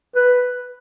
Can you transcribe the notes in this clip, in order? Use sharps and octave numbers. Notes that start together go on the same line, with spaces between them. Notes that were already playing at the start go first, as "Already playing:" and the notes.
B4